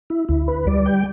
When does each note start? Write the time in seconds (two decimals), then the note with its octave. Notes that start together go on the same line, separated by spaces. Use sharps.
0.10 E4
0.29 D2 E4
0.48 B4
0.67 G3 D5
0.86 G5